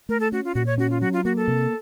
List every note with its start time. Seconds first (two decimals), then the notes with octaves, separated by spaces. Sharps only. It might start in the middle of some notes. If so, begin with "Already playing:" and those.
0.09 A3 A#4
0.20 A4
0.32 C#4 F#4
0.44 F4
0.55 A#2 F#4
0.66 C#5
0.78 C#4 F#4
0.90 F4
1.01 F#3 F#4
1.13 F4
1.25 A#3 F#4
1.36 A4
1.48 C3